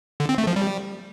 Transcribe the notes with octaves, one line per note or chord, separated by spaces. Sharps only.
D3
C4
A3
F3
G3